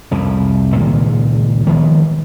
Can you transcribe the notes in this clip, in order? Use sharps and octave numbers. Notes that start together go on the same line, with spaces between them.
C2 F2 C3
C#2 A#2 D#3 G#3
D#3 F3 G#3 B3